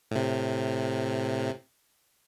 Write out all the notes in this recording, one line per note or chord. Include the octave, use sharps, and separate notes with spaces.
A2 C3